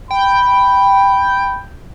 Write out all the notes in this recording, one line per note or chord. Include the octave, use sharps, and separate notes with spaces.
G5 B5